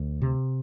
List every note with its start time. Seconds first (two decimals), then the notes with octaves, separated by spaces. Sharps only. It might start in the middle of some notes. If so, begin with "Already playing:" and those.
Already playing: D2
0.22 C3